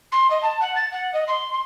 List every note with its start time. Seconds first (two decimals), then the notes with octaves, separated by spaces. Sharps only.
0.12 C6
0.30 D#5
0.42 A5
0.60 F#5
0.75 A6
0.92 F#5
1.13 D#5
1.27 C6
1.52 C6